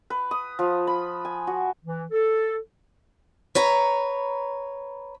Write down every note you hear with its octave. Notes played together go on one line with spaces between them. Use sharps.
B4
D#6
F3
B5
G#5
F#4
E3
A4
B4 C#5 A#5